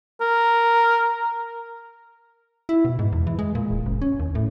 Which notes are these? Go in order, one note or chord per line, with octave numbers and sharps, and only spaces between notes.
A#4
E4
B2
G#2
E2
E3
G#3
A#2
D1
F#1
C#4
D#2
A2